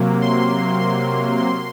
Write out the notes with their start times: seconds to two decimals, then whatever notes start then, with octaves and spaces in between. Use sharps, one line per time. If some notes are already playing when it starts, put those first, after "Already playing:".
Already playing: C3 F#3 A#3
0.22 C6
0.79 C6
1.37 C6